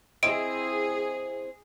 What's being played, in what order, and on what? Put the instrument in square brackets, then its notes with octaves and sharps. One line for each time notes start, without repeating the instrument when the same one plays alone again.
[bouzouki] C4 E4 D#5 [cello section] G#4 [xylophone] D7